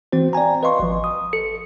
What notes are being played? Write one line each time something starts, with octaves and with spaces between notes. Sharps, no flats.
E3 C4 F#4 C5
D5 G5 G#5 A#5
B4 D#5 F5 C6 C#6
G#1 F3
D#6
A4 C#7